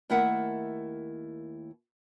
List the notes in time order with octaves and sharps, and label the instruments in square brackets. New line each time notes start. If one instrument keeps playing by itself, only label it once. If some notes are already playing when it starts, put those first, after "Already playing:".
[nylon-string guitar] D#2 A3 E4 A#4 E5 F#5